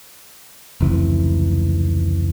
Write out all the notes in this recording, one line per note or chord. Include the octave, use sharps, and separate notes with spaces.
F1 C#2 E3